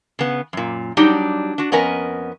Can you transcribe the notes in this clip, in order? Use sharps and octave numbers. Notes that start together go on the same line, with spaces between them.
C#3 B3
F#2 A#2
F#3 G3 D4 D#4 G4
D4 F#4
F2 B3 C#4 A#4 D#5 G#5